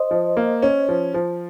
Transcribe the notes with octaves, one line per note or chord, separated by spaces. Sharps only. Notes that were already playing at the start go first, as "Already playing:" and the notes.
Already playing: C5 D#5
F3
A#3
C#4
F3
F3